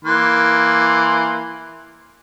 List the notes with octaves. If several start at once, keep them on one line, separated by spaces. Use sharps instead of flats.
E3 A#3 C6